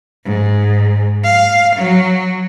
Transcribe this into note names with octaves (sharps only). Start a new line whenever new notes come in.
G#2
F5
F#3